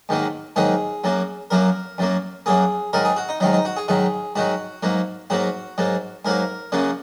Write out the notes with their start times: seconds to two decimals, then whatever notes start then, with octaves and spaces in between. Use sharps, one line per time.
0.09 G#2 D#3 F#3 A#3
0.56 G#2 D#3 F#3 A#3 G#4
1.04 F#2 F#3 A#3
1.50 F#2 F#3 A#3 A#4
1.98 F#2 F#3 A#3
2.46 F#2 F#3 A#3 G#4
2.93 G#2 D#3 F#3 A#4
3.05 G#4
3.16 F#4
3.29 D#4
3.40 G#2 D#3 F#3 D#4
3.53 D#4
3.65 F#4
3.77 G#4
3.88 G#2 D#3 F#3 G#4
4.36 G#2 D#3 F#3 F#4
4.83 G#2 F#3 A#3
5.30 G#2 F#3 A#3 F#4
5.78 G#2 F#3 A#3
6.25 G#2 F#3 A#3 A#4
6.72 F#2 C#3 F#3 A#3